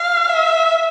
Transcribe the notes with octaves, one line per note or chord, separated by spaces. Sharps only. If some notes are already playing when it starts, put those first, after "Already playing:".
Already playing: F5
E5